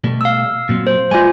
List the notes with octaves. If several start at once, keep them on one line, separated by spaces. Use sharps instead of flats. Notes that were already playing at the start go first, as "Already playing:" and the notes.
B2 G3 A3
F5 E6
A#2 F#3 C4
C5
G#3 B3 F4 D5 G#5